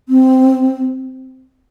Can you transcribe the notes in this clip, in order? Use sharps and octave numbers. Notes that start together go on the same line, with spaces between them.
C4